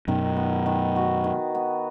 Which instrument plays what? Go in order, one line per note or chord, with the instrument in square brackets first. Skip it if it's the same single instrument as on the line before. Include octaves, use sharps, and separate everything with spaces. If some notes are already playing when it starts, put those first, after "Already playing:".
[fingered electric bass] F#2 B2 [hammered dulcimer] D#3
[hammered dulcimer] B3
D#3
F#4
D#3
B3